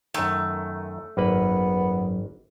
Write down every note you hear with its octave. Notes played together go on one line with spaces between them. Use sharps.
F#2 D#3 A3
G#1 F#2 A#3 B3 B4